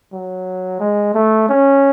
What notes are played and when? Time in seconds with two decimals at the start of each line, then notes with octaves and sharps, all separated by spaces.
0.13 F#3
0.80 G#3
1.15 A3
1.49 C#4